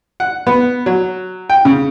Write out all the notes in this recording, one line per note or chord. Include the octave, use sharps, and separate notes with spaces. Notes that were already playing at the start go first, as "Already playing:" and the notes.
F#5
B3
F#3
G5
C#3